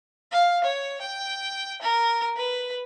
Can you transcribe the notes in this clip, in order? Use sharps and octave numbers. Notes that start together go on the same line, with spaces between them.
F5
C#5
G5
A#4
B4